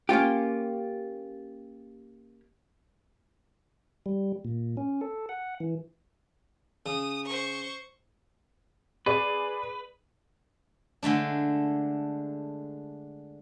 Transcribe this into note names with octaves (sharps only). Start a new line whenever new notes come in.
A#3 C#4 F4 G4
G3
A#2
C#4
A4
F#5
E3
C#3 D#6
C5 C#6
G#4 B4 D5
D3 G#3 A3 D4